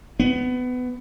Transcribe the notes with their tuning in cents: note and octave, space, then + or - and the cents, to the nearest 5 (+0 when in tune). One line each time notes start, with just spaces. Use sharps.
B3 +20